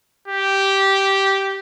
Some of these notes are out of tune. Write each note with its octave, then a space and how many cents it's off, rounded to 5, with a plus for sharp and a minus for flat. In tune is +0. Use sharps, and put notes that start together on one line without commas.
G4 -10